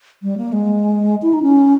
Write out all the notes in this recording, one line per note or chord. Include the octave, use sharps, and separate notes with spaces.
G3
A#3
G#3
E4
D#4
C#4